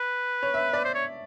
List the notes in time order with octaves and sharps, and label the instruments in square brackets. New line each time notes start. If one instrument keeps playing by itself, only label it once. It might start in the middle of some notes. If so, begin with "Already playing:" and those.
Already playing: [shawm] B4
[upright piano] C#5
E5
D5
[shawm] C5
C#5